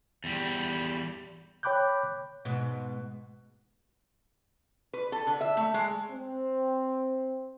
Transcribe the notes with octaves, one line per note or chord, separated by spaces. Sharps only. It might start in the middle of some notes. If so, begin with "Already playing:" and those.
E2 G3
C#5 G5 B5 D6 F#6 G6
G#2 B2
B4
A4
D3
E5
A3
G#3
C4